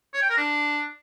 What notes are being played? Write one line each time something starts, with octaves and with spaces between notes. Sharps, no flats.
C#5
G5
A#4
D4